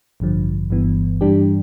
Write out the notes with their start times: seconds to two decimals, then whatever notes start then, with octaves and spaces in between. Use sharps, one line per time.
0.20 A1 G2 D3 F3
0.70 G1 G2 E3 B3
1.21 G2 E3 G3 D4 G4